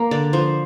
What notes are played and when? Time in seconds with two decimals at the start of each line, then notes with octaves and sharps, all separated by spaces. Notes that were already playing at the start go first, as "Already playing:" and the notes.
Already playing: A#3
0.11 D3 D5
0.33 F3 C5